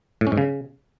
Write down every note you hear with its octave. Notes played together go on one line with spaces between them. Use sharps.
A2
C#4
G#2
C#3